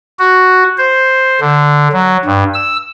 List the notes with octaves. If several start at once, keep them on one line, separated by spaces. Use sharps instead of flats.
F#4
C5
D3
F#3
G2
E6